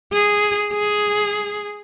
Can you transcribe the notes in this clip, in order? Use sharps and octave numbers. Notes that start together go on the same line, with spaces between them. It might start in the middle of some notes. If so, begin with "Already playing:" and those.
G#4
G#4